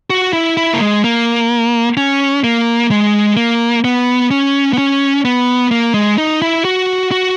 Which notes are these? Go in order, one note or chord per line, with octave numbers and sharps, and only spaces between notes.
F#4
E4
E4
A#3
G#3
A#3
C#4
A#3
G#3
A#3
B3
C#4
B3
C#4
B3
A#3
G#3
D#4
E4
F#4
F#4